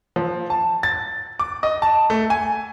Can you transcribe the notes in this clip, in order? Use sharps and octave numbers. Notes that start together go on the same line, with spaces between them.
F3
A5
A6
D6
D#5
A5
A3
G#5